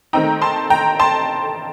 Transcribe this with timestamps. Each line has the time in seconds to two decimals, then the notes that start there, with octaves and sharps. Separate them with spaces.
0.13 D#3 A3 C4 D#4 G5 A#5
0.42 A5 C6
0.70 G5 A#5
1.00 A5 C6